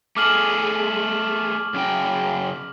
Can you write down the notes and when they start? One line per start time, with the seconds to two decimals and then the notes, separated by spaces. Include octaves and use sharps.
0.16 A3 G#4 D6 F6 F#7
1.74 F#2 C#3 G5